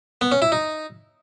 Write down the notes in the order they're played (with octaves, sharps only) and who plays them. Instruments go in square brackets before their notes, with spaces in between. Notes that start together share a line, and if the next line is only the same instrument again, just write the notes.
[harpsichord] B3
C#4
E4
D#4